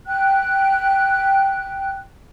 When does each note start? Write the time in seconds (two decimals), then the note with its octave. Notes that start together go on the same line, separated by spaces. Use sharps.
0.07 G5 F#6